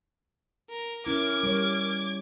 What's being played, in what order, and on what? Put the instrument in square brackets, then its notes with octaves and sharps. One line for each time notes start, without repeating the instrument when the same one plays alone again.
[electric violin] A#4
[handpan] C#4 E4 [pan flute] A#4 [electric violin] D6 G#6
[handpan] G3 C#5